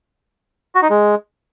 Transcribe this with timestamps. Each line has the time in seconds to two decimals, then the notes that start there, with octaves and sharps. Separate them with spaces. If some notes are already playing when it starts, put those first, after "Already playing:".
0.75 F#4
0.82 D#4
0.90 G#3